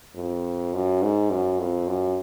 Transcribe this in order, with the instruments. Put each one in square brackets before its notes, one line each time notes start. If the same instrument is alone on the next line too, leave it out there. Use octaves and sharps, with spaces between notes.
[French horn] F2
F#2
G#2
F#2
F2
F#2